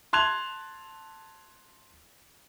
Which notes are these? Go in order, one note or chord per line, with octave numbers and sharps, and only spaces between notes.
A5 C6 F#6 G#6 F7